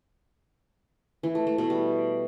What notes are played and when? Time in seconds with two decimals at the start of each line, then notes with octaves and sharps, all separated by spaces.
1.23 E3
1.35 A3
1.47 A3
1.58 B2
1.70 G3